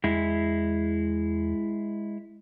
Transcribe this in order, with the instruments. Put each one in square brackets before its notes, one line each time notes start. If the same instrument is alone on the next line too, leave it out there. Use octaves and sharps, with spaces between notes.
[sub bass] E2 [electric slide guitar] G#3 E4